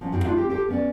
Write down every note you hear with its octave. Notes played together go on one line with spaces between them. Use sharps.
F3 F#3 C#4
F#2 D#3 C4 F#4 G5
A3 D4 D#4 F4
C4 G4
G4 A4 C5 G5
B3 C#4 D5